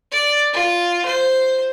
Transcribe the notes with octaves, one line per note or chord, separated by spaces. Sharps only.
D5
F4
C5